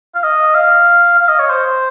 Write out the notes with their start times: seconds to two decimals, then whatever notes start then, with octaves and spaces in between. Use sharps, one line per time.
0.15 F5
0.24 D#5
0.55 F5
1.19 F5
1.29 D#5
1.39 C#5
1.50 C5